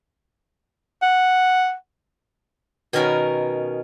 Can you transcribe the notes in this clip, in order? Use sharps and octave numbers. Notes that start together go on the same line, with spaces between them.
F#5
B2 D#3 C#4 A#4 G#5 B5